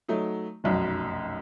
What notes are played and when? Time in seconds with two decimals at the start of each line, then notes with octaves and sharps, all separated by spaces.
0.08 F#3 A3 D#4
0.64 F1 B1 F#2